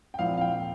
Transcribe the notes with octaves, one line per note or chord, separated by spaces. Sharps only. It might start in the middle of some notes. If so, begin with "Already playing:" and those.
G5
A#2 F3 C4 E4 F5
F5
G5